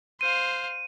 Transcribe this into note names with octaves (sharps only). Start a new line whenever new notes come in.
C5 F5 D#7